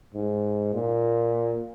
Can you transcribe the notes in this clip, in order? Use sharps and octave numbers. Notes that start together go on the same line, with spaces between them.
G#2
A#2